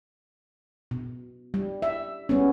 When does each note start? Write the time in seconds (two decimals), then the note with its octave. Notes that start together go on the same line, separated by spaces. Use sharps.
0.91 B2
1.54 G3
1.82 E5
2.29 G3 B3 C#4